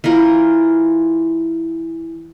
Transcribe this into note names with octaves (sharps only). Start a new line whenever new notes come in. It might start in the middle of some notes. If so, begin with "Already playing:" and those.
E3 F4 A#4